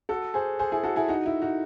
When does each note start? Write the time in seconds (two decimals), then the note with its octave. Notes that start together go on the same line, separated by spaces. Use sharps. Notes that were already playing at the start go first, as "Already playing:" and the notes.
0.09 F#4 A4
0.34 G#4 C5
0.59 G#4 C5
0.72 E4 G#4
0.83 F#4 A4
0.96 E4 G#4
1.08 D#4 F#4
1.26 E4
1.42 D#4 F#4